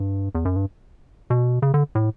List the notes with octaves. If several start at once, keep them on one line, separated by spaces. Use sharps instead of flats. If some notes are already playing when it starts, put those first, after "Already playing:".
Already playing: G2
E2
F#2
G2
B2
C#3
D3
A2